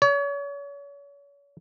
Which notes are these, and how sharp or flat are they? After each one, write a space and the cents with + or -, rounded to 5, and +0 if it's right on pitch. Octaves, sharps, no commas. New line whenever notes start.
C#5 +35